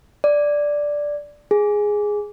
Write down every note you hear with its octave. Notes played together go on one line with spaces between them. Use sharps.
D5
G#4